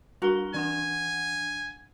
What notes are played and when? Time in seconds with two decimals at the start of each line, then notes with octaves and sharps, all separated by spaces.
0.22 G3 D4 F#4 A#4 G7
0.54 E3 D4 F#5 G#5